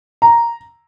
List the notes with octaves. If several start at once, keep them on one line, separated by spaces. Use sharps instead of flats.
A#5